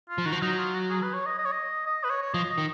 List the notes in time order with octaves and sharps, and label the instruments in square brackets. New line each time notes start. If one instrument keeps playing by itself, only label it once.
[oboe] F4
[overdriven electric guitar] F3
[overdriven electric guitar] D#3 [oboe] F#4
[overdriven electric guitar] F3
[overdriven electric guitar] F#3 [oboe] D#4
[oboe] F4
F#4
G#4
B4
C#5
D#5
D#5
C#5
D#5
D#5
B4
C#5
C#5
[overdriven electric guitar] F3 [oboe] D#5
[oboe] D#5
[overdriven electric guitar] D#3